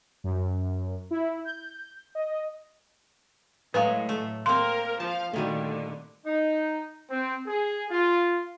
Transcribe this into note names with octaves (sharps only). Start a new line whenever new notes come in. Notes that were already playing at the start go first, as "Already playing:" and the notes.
F#2
E4
G6
D#5
A2 F#3 G#3 B4 F5
A3
A#3 C4 A#4 C5 C6
F3 F5 A5
A#2 D3 D#3 G3 A3 F#4
D#4
C4
G#4
F4